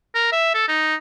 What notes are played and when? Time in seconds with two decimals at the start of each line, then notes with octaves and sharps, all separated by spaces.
0.15 A#4
0.32 E5
0.54 A4
0.68 D#4